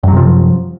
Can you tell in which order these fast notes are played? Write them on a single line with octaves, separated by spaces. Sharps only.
F#2 F#3 C3 F3